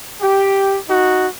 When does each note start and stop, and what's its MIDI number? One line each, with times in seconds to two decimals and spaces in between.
0.21 0.75 67
0.88 1.26 63
0.88 1.26 66